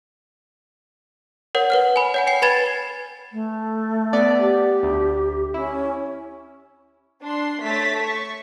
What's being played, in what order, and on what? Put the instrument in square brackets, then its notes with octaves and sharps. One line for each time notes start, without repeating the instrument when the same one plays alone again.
[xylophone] A#4 C#5 F#5
B4 F#5 F6
G#5 B5
C#5 F#5 G#5
G5 G#5 C7
B4 G#5 B5 G#6 A6 E7
[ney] A3
[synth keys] B3 D5
[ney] G4
[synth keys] D2
[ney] C#4 [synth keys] E4
[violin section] D4 C6
A3 A4 C#5 A6 B6
C#6